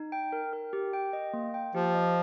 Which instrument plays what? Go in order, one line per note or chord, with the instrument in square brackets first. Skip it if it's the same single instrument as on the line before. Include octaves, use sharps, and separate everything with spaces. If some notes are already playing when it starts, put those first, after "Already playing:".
Already playing: [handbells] D#4
G5
A#4
A#4
G4
G5
D#5
A#3
G5
[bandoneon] F3 [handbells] G4
[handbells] D#5